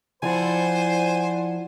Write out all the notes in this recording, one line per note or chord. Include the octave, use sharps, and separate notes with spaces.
F3 E4 C5 D5 F#5 G#5